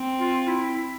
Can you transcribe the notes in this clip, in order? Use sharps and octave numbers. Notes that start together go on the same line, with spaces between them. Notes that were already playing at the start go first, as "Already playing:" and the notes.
Already playing: C4
F4
E4
E4